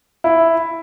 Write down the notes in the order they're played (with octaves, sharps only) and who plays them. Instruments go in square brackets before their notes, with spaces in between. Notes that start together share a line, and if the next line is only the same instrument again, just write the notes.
[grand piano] E4